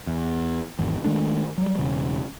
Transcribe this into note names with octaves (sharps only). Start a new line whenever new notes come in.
E2
G#1 E2
D#3 G#3 A3 D4
F#3 G3
E1 C#3